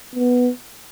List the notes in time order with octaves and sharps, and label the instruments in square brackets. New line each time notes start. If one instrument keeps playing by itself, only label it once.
[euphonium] B3